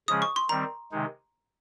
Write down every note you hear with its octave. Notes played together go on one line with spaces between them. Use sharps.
C#3 F3 G#3 C#4 G#4 D#6
C#6
C6
D#3 G3 C4 A#5
C3 D#3 G#3 D#4